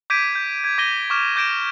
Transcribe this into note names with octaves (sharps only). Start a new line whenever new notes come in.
D6 G6 G#6 B6 D7 D#7
G6
G#6
D6 A#6 D#7 G7
C#6 D6 F6 E7
D6 G6 A#6 D7 E7